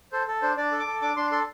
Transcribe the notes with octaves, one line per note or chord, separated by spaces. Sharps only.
A4 C5
A4
D4 C5
D4 D5
A4
D6
A4
D4 D6
D4 C6
A4 C6